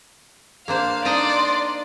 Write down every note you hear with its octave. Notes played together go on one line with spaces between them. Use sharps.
A#3 D4 C5 F5
D4 D#4 D5 D#5 C6